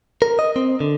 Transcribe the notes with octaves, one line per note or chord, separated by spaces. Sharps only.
A#4
D#5
C4
D3